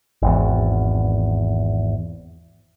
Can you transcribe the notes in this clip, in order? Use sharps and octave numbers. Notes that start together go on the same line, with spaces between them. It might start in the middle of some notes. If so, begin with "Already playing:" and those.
G#1 E2